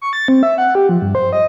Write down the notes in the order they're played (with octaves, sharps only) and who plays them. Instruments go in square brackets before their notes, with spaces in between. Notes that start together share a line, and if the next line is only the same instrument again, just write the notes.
[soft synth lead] C#6
A6
C4
E5
F#5
G4
F3
G2
C5
D#5